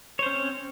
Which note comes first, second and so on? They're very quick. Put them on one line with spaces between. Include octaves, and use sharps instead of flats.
C#5 C5 C#4 C4